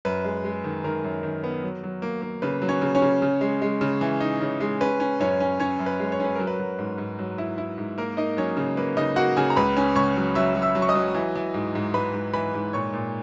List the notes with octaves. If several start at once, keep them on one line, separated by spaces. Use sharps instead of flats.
F#2 B4
G#3
G#3
D#3
D#3 A#4
F#2
D#3
B3
F#3
F#3
A#3
A#3
C#3 B4
F#3
C#4 C#5
C#3
C#4 C#5
C#3
C#3
G#3
G#3
C#3
E3
D#4
C#3
G#3
C#4 B4
C#4
F#2 C#4 C#5
C#4
C#4 C#5
F#2
B4
G#3
C#5
C#4 B4
F#3 A#4
B4
F#3
G#2
G#2
F#3
E4
E4
G#2
A#3 A#4
A#3 D#4 D#5
F#3 C#4 C#5
C#3
A#3 B4
C#3 D#4 D#5
A#3 F#4 F#5
C#3 G#4 G#5
A#5
C#2 B4 B5
C#4
C#2 C#5 C#6
F#3
F#3 E5 E6
F#3
E5 E6
F#3
C#6
D#5 D#6
F#3
E3
E3
G#2
G#2
G#2 B4 B5
G#2
E3 B4 B5
G#2
A#2 C#5 C#6
A#2